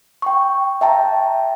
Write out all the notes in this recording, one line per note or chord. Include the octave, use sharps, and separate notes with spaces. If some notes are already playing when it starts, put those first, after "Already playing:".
G5 C#6
E5 G5 A5 A#5